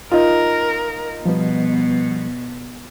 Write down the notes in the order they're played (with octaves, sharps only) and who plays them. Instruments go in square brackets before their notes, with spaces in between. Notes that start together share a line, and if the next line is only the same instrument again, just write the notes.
[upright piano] D#4 F4 [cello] A#4
[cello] B2 [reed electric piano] F3 G3 B3